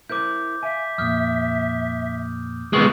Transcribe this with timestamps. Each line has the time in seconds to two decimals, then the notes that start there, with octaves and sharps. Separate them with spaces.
0.10 E4 A#4 C5 D6 G6
0.63 E5 F5 G#5
0.98 F2 A#2 D#6 F6 G6
2.73 G#3 B3 C#6